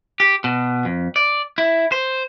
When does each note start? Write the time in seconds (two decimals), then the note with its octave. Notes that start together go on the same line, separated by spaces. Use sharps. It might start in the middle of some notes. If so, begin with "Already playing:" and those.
0.20 G4
0.44 B2
0.85 F2
1.16 D5
1.58 E4
1.92 C5